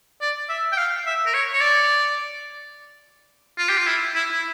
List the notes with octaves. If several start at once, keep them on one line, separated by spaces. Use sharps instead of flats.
D5
E5
G5
F5
E5
A#4
C#5
C#5
D5
F4
G4
F4
E4
E4
E4